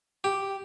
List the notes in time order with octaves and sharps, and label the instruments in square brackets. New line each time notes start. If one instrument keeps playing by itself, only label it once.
[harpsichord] G4